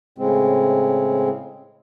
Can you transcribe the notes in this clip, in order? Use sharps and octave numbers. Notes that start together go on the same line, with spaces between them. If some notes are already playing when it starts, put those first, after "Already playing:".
A2 C#3 G#3 C4